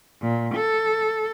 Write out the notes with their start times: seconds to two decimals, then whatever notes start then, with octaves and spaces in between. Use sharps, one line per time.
0.22 A#2
0.56 A4